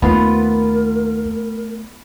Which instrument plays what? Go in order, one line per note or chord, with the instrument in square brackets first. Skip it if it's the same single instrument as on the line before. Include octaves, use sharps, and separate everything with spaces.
[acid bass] D#2 [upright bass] A3 [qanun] B3 F4 [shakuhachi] A#4